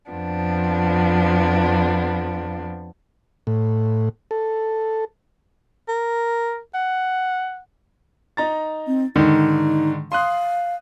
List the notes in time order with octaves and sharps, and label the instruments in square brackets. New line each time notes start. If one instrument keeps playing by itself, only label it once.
[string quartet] F2 F3 B3 D4
[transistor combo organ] A2
A4
[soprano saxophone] A#4
F#5
[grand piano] D#4 A#5 A6
[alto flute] C4
[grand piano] G#2 D3 D#3 [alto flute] D#4
[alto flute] F5 [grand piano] C6 D#6 F#6